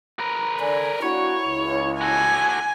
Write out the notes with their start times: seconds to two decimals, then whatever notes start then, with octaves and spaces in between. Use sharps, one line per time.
0.20 A#4 B4
0.60 D3 A4 D5 G#5
1.02 A#3 D4 E4 F#4 C#5
1.46 C#2
2.01 F#4 A4 G#5